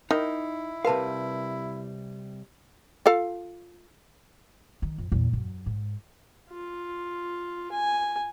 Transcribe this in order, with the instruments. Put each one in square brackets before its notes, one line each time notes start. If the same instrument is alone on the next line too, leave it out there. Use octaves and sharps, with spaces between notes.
[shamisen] D#3 [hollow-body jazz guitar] D#4 [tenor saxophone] E4
[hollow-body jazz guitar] C3 G3 F5 [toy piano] A#4 B4 A5
[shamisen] F4 A4 F5
[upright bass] D#3
F2
E2 A#2
F#2
G#2
[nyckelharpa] F4
G#5